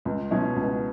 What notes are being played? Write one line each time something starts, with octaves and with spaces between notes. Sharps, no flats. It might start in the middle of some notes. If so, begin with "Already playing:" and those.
C#2
B2 F#3 C#4 E4
C#2